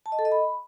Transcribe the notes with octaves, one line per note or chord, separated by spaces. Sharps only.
A5
D#5
A4
D#5
B5